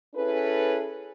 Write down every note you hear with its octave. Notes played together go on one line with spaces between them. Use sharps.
C#4 E4 G#4 A4 B4